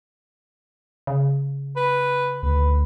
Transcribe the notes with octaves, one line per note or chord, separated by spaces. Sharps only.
C#3
B4
D2 B4